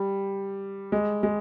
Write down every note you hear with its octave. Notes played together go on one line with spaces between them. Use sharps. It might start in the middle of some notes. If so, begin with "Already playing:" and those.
Already playing: G3
G#3
G#3